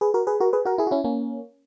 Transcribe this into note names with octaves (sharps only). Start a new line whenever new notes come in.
G#4 B4
F#4 A#4
G#4 B4
F#4 A#4
G#4 B4
F#4 A#4
E4 G#4
F#4
C#4 E4
A#3 C#4